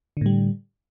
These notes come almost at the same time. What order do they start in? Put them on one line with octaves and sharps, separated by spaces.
D3 A2 G3